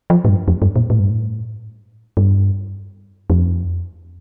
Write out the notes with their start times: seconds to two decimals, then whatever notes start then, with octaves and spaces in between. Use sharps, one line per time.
0.10 F3
0.25 A2
0.29 G2
0.48 F2
0.62 G2
0.76 A#2
0.90 A2
1.00 G2
1.10 A2
2.17 G2
3.30 F2